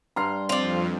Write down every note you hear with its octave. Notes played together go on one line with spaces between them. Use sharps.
G2 A#5 C6 F6 C7
F2 C4 F4 D5